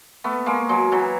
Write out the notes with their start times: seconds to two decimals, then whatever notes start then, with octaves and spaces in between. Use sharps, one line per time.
0.24 A3 B3
0.46 G#3 A#3
0.69 F#3 G#3
0.92 E3 F#3